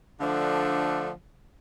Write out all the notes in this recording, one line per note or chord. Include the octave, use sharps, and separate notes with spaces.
D3 F3 A3 D4